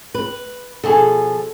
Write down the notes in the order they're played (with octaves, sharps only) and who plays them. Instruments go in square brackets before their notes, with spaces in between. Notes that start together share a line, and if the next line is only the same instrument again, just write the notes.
[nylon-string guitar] B4
[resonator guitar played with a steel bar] B2 F3 G#4 [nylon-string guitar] A4